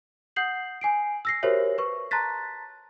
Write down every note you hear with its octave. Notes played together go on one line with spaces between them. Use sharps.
F#5 D#6 G6 C7 F#7
G#5 C7 D7
E6 A#6 C7
F#4 G4 A#4 C5 C#5 E5
B4 C#6
A5 A#5 C6 F#6 A6 B6